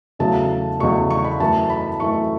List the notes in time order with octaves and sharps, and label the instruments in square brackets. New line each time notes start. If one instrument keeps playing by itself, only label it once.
[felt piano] E2 C#3 F#3 A3 A5
E2 C#3 F#3 A3 C#6
C#6
B5
F#2 E3 A3 A5
B5
F#2 E3 A3 C#6